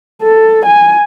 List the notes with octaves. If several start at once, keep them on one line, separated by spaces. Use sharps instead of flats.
A4
G#5